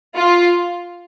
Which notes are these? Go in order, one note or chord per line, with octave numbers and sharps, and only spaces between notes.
F4